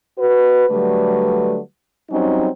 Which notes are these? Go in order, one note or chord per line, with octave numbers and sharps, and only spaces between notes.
F#4 B4
D3 F#3 G3 A3 B4
F#3 G3 C4 C#4 D#4